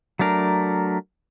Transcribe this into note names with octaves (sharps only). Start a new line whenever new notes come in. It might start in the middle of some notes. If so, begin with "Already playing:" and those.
F#3 A3 D4 A#4